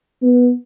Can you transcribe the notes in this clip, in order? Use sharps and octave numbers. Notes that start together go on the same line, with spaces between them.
B3